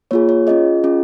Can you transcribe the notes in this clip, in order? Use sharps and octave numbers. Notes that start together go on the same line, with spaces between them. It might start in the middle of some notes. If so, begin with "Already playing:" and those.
A#3 F4 G#4 C#5
C#5
C#4 F4 G#4 D#5
C#4 F4 G#4